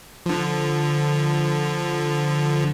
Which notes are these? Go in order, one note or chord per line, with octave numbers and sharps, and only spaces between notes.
D3 F3